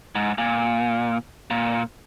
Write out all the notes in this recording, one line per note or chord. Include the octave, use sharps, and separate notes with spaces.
G#2
A#2
A#2